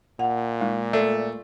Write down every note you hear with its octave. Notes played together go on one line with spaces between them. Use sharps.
A#2 F#5
G#3 D#4
A3 D5